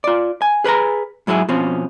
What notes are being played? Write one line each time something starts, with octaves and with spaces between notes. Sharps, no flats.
F4 D5
G#5
G#4 B4 C5 G#5 A#5
G#2 F#3 E4 G4 G#4
B2 F3 C4 C#4